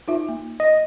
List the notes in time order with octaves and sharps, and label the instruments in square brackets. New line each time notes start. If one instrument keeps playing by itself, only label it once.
[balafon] D#4 F4 E5
A#3
[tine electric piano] D#5